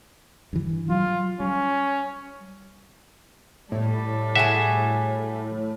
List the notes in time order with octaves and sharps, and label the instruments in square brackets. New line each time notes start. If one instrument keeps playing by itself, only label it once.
[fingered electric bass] G2 E3
[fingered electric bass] F#3 G3 [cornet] F4
[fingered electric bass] G3 [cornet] C#4
[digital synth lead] A2 [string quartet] G3 A4
[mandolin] F#4 G#4 G#5 [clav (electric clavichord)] E5